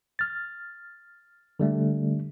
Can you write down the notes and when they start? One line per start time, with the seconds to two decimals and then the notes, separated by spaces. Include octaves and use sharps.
0.19 F6 A6
1.60 D3 G3 A3